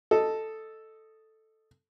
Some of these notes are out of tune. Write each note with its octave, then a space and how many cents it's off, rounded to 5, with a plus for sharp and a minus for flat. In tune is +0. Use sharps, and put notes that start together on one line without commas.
A4 +0 D#5 +0